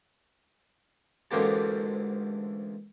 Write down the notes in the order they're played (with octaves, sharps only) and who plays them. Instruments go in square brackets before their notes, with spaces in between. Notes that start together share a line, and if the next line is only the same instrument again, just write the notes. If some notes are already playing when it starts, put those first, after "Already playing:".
[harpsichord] A1 D2 G#2 A#3 G4 A5